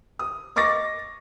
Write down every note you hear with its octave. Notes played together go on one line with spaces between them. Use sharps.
D#6
D#5 C#6 D6 A6 A#6